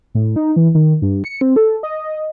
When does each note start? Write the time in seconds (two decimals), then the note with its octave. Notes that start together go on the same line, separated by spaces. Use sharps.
0.15 A2
0.36 D#4
0.56 E3
0.75 D#3
1.02 G2
1.24 C#7
1.41 C4
1.56 A4
1.83 D#5